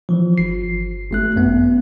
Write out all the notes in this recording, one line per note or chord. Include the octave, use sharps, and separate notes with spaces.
E3 F3
G1 C7
G#1 A3 F#6
F#2 B3